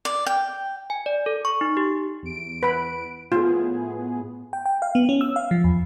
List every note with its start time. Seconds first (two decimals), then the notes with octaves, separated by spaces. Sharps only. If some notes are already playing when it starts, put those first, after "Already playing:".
0.05 D5
0.26 G5
0.90 G#5
1.06 D5
1.26 A4
1.45 C#6
1.61 D#4
1.77 G4
2.23 E2 D7
2.63 B4 B5
3.32 A2 B3 F4 G#4
4.53 G5
4.66 G5
4.82 F5
4.95 B3
5.09 C#4
5.21 E6
5.36 F5
5.51 F3
5.64 E2